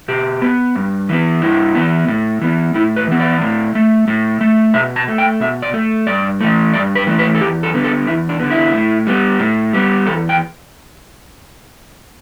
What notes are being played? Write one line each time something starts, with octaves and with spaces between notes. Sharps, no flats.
B2 G4
B3
G2
E3 B3
G2 E4
E3 B3
A2
E3 B3
A2 E4
B4
E3 B3
D5
A2
A3
A2
A3
B2 E5
A5
A3
G5
B2 E5
D5
A3
G2 D5
E3 A3
G2 D5
B4
E3 A3
B4
A4
E2 G4
A4
D3 B3
A4
E2 E4
D4
D3 B3
E4
A2
G3 B3
A2
G3 B3
E2 A4
G5